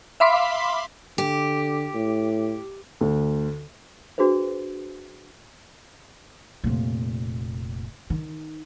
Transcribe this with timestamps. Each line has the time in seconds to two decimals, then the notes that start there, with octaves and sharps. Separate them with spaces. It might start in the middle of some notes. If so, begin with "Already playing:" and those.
0.20 E5 F5 B5 C6 D6 B6
1.18 D3 G4
1.94 A2
3.01 D2
4.18 D4 F#4 G#4 B4 C5
6.64 F1 A#2
8.10 D#3